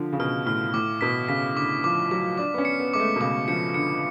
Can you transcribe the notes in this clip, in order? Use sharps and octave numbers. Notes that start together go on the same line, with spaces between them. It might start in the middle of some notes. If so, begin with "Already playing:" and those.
Already playing: D3 F3
C#3
B2 F6
A2 F6
A2 D6
B2 B6
C#3 B6
D3 D6
F3 D6
F#3 D6
D4 D6
B3
C#4
C#7
B3
G#3 D6
A3
B2
C#3 D6
F3 C#7
D3 C#7